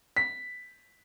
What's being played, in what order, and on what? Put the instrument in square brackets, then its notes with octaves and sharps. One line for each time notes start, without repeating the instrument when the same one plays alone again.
[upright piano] B6